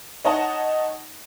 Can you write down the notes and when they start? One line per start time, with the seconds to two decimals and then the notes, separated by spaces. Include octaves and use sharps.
0.25 D#4 C#5 D#5 F#5 A5